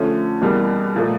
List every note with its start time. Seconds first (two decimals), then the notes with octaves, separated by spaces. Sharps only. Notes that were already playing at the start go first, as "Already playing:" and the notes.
Already playing: D3 F3 A3 C#4
0.42 E2 B2 G3 A#3
0.96 A#2 F3 A3